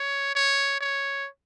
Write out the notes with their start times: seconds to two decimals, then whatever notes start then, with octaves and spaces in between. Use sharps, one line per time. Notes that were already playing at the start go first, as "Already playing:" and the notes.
Already playing: C#5
0.35 C#5
0.80 C#5